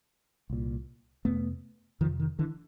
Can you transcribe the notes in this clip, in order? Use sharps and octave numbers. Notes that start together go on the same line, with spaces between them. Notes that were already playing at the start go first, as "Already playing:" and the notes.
C2 A#2
F2 C3 A3 B3
F2 C3 D#3 F3
D#3
D3 E3